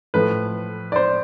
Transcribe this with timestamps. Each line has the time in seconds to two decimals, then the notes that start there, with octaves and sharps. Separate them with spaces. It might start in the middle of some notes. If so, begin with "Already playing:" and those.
0.14 A2 F3 A3 B4
0.92 D5
0.96 C5